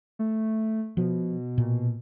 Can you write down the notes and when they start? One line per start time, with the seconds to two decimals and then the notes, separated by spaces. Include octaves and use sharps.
0.19 A3
0.97 B2 F3
1.58 A#2